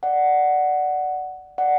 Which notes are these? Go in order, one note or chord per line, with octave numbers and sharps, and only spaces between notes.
D5 F#5
D5 F#5